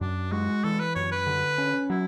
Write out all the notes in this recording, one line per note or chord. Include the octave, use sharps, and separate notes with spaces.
F#2 D4
G#3 F#4
E3 A4
B4
F#2 C#5
B4
D3
C#4
F#3 E4